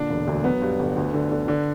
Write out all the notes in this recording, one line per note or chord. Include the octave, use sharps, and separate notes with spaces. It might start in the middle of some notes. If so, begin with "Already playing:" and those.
Already playing: A#2 D3 D4
E1
D2
F#3 B3
G2
G1
D2
D3
D3
D3